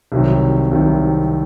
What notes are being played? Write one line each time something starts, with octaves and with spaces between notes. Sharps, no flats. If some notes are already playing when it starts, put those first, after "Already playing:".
C2 C3 D#3 F#3
C2 C3 D#3 F#3